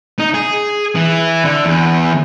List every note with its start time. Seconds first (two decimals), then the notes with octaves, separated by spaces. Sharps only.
0.19 D#4
0.34 G#4
0.95 E3
1.45 D3
1.65 E2